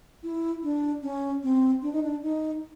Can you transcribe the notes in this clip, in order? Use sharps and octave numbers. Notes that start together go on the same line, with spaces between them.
E4
D4
C#4
C4
D4
D#4
D4
D#4